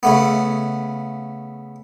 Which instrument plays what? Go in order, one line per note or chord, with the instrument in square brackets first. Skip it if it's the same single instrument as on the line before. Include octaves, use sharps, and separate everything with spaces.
[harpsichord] C#3 A3 B3